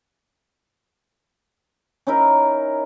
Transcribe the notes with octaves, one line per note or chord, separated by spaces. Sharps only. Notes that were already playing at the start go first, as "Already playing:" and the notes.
C#4 D#4 E4 A#4